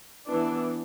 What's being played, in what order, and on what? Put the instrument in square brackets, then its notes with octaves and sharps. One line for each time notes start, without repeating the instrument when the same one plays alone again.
[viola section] E3 B3 D4